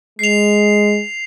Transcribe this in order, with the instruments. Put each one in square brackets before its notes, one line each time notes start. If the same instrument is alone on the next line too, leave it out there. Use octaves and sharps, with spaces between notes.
[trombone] G#3 [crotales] C7 F7